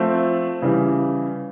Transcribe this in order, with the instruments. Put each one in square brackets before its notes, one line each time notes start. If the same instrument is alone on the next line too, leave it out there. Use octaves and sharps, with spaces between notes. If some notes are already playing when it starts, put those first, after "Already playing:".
Already playing: [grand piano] F3 A3 C4
C#3 E3 G3